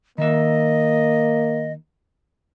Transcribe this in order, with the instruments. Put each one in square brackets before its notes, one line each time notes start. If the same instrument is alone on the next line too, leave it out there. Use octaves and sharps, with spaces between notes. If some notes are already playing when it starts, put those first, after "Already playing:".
[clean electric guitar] D#3 E5 [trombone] A#3 [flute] D#5